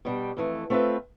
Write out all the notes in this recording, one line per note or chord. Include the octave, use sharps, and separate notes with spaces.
B2 G3 D4
F2 E3 A3
A3 C4 F4 B4 E5